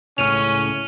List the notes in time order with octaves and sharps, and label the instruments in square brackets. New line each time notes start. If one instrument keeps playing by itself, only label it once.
[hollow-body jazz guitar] C#2 A2 C#3 [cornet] C#4 [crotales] F6 D#7 F7